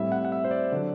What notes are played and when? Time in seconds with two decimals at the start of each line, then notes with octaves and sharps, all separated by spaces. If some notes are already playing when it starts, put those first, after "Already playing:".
Already playing: A2 G3 C4 E4 E5
0.12 F#5
0.25 F#5
0.32 E5
0.44 C5
0.51 D5
0.72 D3 F#3